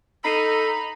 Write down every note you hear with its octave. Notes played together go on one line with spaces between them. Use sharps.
D#4 A4 A#5 B5 C7 D#7